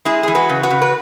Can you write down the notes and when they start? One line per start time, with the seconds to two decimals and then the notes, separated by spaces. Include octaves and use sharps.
0.05 G#3 E4 G#4
0.23 E3 G#4
0.35 F#4 B4
0.49 C#3
0.63 F#4 B4
0.70 C#3
0.82 B4